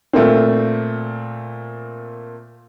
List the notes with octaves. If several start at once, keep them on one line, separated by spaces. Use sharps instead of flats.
A#2 A3 A#3 C4